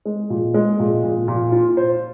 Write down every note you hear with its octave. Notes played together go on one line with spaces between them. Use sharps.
G#3
A#2
G#3
A#2
A#2
A#2
F4
C5